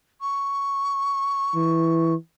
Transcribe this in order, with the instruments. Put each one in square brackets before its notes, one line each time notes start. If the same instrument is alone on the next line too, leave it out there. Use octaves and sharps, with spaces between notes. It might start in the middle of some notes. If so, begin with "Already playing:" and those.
[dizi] C#6
[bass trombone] E3